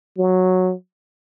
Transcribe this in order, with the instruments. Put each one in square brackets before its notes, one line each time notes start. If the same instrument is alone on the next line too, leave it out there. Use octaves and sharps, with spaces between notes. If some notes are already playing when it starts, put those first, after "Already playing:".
[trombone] F#3